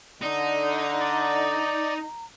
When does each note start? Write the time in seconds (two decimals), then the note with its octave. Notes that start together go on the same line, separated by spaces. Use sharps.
0.22 D3 D#4 D5
1.00 D5 A#5